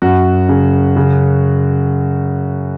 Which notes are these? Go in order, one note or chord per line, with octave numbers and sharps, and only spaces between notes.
F#2 F#4
C#3
C#3